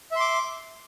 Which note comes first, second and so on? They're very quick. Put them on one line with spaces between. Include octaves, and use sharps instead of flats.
E5 C6 D6